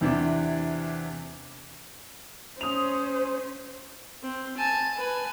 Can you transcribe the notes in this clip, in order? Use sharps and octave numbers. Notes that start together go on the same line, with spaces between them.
E2 C3 E3 D4
C#4 C5 D#6 F7
C4
G#5 A5
B4 G#5